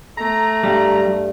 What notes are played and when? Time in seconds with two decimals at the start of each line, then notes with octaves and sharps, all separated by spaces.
0.17 A3 A#5
0.63 G2 G3